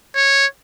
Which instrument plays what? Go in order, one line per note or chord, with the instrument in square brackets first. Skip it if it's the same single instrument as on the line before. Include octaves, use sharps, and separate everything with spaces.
[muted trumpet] C#5